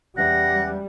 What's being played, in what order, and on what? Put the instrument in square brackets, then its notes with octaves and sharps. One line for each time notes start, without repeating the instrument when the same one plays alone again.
[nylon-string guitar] E2 C#4 E5 [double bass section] G3 [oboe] F#5 [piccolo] A#6